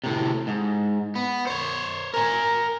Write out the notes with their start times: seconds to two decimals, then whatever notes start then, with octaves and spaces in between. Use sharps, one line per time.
0.04 A2 C3
0.47 G#2
1.15 B3
1.47 C5 C#5
2.14 A#4 G#5